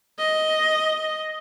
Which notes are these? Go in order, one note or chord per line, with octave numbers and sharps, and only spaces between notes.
D#5